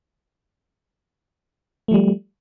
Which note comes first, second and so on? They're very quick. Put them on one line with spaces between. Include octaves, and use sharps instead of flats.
A3 F3 G3